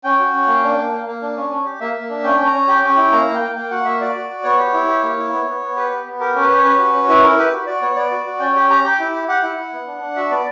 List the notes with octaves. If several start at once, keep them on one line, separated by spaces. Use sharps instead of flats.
C#4 G5
F#4
C#4
A#3
D4
A#3
A#3
A#3
D4
C#4
C#4
G4
A#3 E5
A#3
D4
C#4 G5
C#4
A#5
C#4
G4 G5
C#4
G5
E4
A#3 A#5
A#3
G5
A#3
A#3 G5
F#4 F#5
A#3 E5
F#4 D5
F#4
F#4
B3 C#5
G4
E4
G4
A#3
E4
B3
B3
B3
G4 B4
B3
B3
G4 A#4
C#4
B4
G4
C#5
C#4 B4
F#4
C#4
E4 B4
E4 A#4
G4 B4
F#4
F#4 D5
B3 C#5
B3 D5
F#4
F#4
C#4 G5
G4 G5
G4 A#5
G4 G5
E4
G4
G4 F#5
E4
E4
B3
D4
D4
F#4 E5
B3 D5